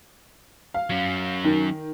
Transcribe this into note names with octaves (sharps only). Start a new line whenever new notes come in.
F5
F#3 C#4
D#3